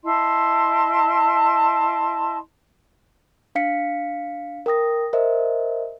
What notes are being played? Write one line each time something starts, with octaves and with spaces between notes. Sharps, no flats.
E4 D#5 A5 C6
D4 F5 B6 C#7
A#4 G5 D#6 A#6
A#4 C5 D#5 E5